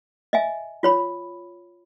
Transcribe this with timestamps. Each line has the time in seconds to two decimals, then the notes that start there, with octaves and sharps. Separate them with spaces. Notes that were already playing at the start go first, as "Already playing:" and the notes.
0.33 D#5 E5 G#5
0.83 F4 C#5 B5